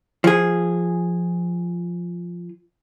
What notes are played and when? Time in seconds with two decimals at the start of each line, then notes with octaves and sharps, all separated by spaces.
0.24 F3 G#4